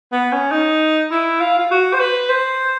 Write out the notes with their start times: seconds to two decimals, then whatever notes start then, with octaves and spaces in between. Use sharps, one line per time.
0.12 B3
0.32 C#4
0.51 D#4
1.11 E4
1.40 F4
1.59 F4
1.71 F#4
1.93 C5
2.00 B4
2.29 C5